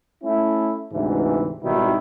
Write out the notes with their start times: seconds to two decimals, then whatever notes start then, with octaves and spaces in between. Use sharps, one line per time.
0.23 A3 C#4 E4
0.92 D2 G#2 C3 E3
1.63 G#1 B2 D#3 G3 E4